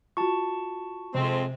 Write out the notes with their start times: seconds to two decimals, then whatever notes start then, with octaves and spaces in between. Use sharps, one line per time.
0.17 F4 F#4 A5 C#6
1.14 F2 C3 G#3 C4